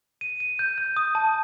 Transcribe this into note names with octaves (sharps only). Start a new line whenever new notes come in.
D#7
D#7
G6
G6
D#6
A5